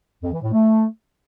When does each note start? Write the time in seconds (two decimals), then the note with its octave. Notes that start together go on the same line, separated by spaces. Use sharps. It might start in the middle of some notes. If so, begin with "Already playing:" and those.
0.23 F2
0.33 E3
0.42 A2
0.52 A3